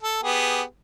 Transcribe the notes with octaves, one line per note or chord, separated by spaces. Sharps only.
A4
B3 G4 G#4